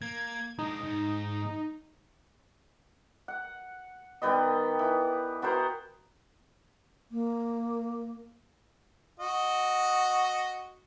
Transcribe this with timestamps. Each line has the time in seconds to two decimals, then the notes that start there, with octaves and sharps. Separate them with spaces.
0.02 A#3 G#6
0.59 G#3 D4 D#4
0.83 G#2
3.28 F#5
4.22 D#3 G3 B3 D#5
4.79 E3
5.42 B3 F#4 A#4 C5
7.12 A#3
9.20 F#4 D#5